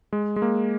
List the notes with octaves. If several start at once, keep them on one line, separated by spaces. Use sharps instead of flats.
G#3
G#3
A#3